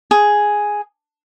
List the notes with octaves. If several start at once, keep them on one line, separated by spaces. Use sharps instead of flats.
G#4